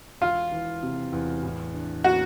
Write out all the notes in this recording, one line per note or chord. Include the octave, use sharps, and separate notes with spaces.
E1 F4
E3
C3
E2
A2
D4
A#3 F#4